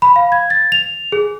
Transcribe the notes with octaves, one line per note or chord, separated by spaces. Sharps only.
B5
F5
G#6
A6
F7
G#4